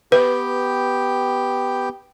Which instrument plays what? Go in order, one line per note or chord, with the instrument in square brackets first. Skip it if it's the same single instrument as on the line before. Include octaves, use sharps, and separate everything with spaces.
[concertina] B3 G4 G5 [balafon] B4